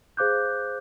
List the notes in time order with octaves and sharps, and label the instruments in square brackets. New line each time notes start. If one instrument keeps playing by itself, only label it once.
[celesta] G#4 C5 F5 D6 F#6 G6